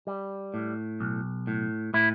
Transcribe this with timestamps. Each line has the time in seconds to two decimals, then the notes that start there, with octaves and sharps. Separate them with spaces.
0.07 G3
0.54 A2
1.00 B1
1.47 A2
1.94 A2 E4